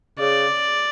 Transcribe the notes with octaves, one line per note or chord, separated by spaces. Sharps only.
C#3 D5